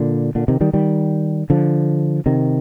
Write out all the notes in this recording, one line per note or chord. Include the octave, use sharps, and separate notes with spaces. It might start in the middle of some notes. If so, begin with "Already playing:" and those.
Already playing: A#2 D3
A#2 D3
C3 D#3
D#3 G3
D#3 G3
D3 F3
C3 D#3